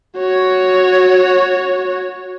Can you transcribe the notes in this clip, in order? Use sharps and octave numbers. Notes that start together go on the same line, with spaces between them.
F#4 C#5